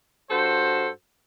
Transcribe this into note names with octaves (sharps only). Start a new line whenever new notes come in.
G2 F#4 A4 C5